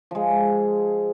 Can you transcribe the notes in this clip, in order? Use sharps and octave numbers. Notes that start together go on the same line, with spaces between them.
F3 G#3